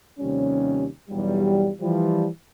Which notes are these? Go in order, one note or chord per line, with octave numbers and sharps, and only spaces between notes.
D#2 C3 F3 G3 C#4
B1 E2 G2 F#3 G3
E3 F3 G3